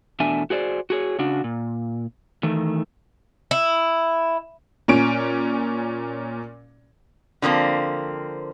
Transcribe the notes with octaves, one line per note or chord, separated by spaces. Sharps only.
E2 B2 A3 D4 E5 G#5
F#4 G#4 C5 D5
F#4 G#4 C#5
C#3 D4 F#4
A#2
D#3 E3 A3
E4
A#2 C#4 D7
D3 F3 A#3 C4